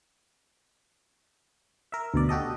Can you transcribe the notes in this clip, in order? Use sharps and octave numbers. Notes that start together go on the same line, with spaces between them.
A#4 E5
D2 B2 D5
F#4 G4 A4 D#5